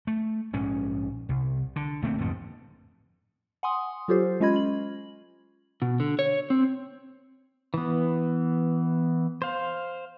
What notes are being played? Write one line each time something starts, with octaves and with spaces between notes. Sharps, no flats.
A3
A#1 G#2 G#3 C#4
C2
D3
A#1 A3 A#3 C4
A1 F2 G#2 D3
F#5 G#5 C6 D#6
F#3 F4 G4 A4 C5
G#3 C#4 F4 D#5 B5 G#6
F#7
B2
D3
C#5
C4
E3 B3
C5 F5